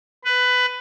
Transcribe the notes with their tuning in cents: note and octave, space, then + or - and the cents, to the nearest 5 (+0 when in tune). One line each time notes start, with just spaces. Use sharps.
B4 +15